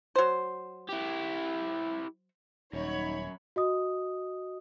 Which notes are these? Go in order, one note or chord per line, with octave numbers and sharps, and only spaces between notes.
F#3 C5
E4 G4
D#1 F#2 D#4 C#5 B5
F#4 D#5 D#6